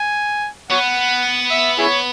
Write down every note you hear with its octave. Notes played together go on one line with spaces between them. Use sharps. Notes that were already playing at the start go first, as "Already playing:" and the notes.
Already playing: G#5
B3 C#5 F#5
E5
E4 G#4 C#5